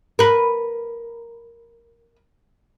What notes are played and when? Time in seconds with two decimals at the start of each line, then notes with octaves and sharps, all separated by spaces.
0.19 A#4 B4